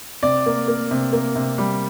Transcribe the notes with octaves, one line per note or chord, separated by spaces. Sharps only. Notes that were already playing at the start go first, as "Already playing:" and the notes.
C3 D5
A#3
A#3
C3
A#3
C3
G3